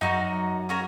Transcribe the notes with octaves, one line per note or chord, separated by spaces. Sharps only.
F#2 D#4 F#4 A#4
C#4 F#4 A#4